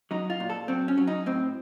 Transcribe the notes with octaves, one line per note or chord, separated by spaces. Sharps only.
F#3 D#4
F4
A#2
A4
F#3 C4
C#4
F#3
D#4
A2 C4